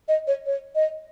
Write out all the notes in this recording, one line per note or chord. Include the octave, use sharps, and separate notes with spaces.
D#5
C#5
C#5
D#5